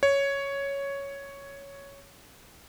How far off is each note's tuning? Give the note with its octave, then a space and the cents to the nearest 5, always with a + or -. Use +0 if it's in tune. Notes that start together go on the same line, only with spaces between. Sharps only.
C#5 +5